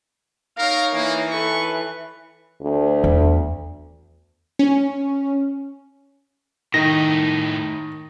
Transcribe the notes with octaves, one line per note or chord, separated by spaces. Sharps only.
D#4 A#4 C#5 F5
E3 A#3
A4 B4 C#6
D2
E2
C#4
A2 D#3 D#4 A#6